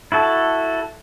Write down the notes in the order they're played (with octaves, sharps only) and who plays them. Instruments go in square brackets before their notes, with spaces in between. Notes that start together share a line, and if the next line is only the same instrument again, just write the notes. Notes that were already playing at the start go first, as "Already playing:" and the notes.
[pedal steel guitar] E4 F#4 A4